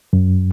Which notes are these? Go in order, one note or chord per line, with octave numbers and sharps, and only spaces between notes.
F#2